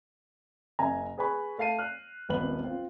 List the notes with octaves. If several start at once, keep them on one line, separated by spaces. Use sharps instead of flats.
F#1 E5 G#5 A#5
G#4 B4 G#5 B5 C#6
A3 F5 A5 C7 D#7
F6 F#6
D#1 G#1 B3 B4 F#7
C4 F4 C5